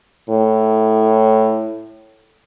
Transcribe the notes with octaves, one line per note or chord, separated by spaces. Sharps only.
A2